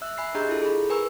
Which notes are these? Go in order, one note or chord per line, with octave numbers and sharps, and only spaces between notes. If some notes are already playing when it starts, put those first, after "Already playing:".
E5 E6 F#6
E5 G#5 B5 F#6 C7
D4 G4 G#4 D#5 A#5 G6
E4 F4 A4
G#4 B5
A#4 B4 G#5 A#5 C#6 E6